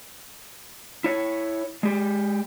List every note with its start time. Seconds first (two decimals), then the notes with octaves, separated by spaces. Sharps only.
1.04 E4 C#5
1.83 G#3 G4